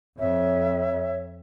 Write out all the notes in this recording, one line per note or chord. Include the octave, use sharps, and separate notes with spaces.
F2 C#5 E5